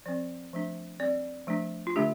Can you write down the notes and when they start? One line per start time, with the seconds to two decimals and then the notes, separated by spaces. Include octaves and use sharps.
0.06 F3 C4 D5
0.53 F3 A3 D4
1.00 C4 D5
1.05 G3
1.47 F3 A3 D4
1.87 F4
1.96 D3 A3 D4 G4